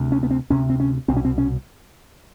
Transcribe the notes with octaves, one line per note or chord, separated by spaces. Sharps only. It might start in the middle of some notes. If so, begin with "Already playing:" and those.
Already playing: D2 C3
C#4
B3
C4
D2 C3 C#4
C4
C#4
C2 B2 C4
C#4
C4
C#4